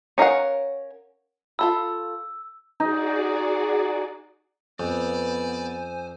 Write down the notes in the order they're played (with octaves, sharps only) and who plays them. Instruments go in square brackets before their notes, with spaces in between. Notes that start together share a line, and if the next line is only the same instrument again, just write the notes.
[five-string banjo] C#4 A#4 F5 F#5
[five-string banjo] F4 A4 B5 [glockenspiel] E6
[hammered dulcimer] D#4 [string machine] F#4 G#4 D5
[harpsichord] F2 [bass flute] B3 [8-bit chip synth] C5 G#5 [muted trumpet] D5